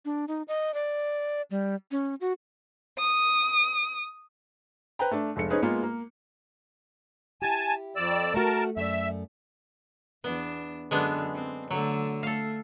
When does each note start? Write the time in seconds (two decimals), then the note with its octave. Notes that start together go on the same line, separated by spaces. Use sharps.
0.05 D4
0.28 D#4
0.48 D#5
0.74 D5
1.51 G3
1.91 C#4
2.21 F#4
2.98 D#6
4.99 B4 C5 G5 A#5
5.11 A3 D4
5.36 F1 G#3 A4 C#7
5.50 C#4 D#4 G#4 B4 C5
5.62 G#3 A#3 B3 F4
5.83 A#3
7.42 E4 G4 G#5 A5
7.96 F2 D5 E6
8.34 A3 F#4 A#4 A5
8.77 F#2 A3 D5 E5
10.24 E2 B3 D4
10.91 F#2 D3 G#3 B3 D4
11.34 C4
11.71 D3 F#3 A3
12.23 A3 A4 F5